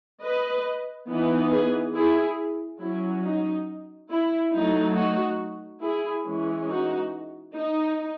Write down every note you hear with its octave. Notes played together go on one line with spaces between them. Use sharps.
B4 D#5
E3 B3 D#4
G#4 B4
E4 G#4
F#3 C#4 E4
D#4
E4
F#3 A3 D#4
D#4 F#4
E4 G#4
E3 G#3 C#4
D#4 F#4
D#4